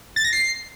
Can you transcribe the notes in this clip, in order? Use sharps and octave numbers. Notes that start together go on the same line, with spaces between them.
A6
A#6
C7